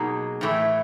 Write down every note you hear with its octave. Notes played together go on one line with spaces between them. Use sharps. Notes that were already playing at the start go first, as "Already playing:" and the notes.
Already playing: B2 F#3 A#3 D#4 G#4
A2 E3 A3